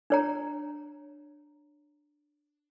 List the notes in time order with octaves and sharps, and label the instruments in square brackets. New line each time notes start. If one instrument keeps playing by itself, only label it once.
[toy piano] D4 C#5 A#5